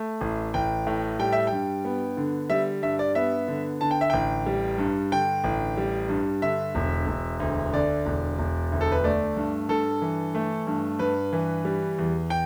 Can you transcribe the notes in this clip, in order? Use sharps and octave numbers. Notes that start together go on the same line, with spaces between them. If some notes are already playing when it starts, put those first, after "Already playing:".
Already playing: A3
A1
A1 G5
A2
G3 G5
E5
G5
G2
B3
D3
G3 E5
G2 E5
D5
B3 E5
D3
D3 A5
G5
E5
A1 G5
G3
G2
D3 G5
A1
G3
G2
D3 E5
E1
E1
D2
D3 D5
E1
E1
D2
A4
B4
A3 D5
G2
G2 A4
E3
A3
G2
G2 B4
E3
G3
E2
G5